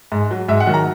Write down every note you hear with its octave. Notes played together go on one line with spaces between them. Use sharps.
G#2
F#3
G#2 E5
F#5
D#3 F#3
A#5